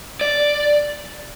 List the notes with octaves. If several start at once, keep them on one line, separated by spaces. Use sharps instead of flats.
D5